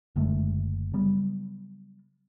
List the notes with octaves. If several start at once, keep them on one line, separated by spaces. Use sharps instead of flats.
F#1 D3 G#3 A3
C#3 F#3 G3 B3